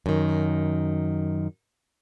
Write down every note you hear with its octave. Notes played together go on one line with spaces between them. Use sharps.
F#2 D#3